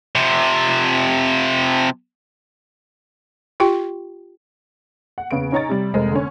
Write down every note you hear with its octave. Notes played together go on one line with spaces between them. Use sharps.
C3 F3
F4 G4 G5
F#5
E2 C#3 B4 D7
C#4 D#4 C#5 A#5 C#6 A6
C3 G3
F1 G#3 A#4 C5
D3 C#4